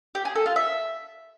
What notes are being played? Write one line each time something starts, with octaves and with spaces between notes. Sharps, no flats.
G4
G#4
A4
F4
E5